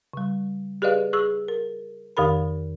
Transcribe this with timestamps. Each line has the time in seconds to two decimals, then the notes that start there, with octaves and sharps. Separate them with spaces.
0.13 C#3 G3
0.82 G4 G#4 B4 D5 D#5 F5
1.13 G#4 C#6 E6
1.48 A#4
2.17 F2 D#3 G4 A#4 B5